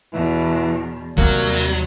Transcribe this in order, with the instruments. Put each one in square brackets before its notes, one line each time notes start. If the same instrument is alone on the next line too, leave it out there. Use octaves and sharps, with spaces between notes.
[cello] E2 B2 [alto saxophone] E3
[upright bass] D#2 [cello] C3 G3 [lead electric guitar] F#3 [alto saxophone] A#3